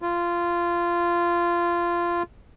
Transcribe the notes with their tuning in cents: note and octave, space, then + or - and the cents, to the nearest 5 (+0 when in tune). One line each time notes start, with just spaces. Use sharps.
F4 -15